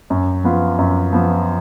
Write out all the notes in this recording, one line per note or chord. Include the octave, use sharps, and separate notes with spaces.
F#2
F3 B3 F4
F#2
F3 B3 F4